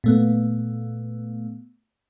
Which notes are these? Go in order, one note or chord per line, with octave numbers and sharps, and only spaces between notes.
A#2 A3 B3